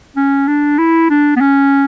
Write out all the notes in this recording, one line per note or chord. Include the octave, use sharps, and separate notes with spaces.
C#4
D4
E4
D4
B3
C#4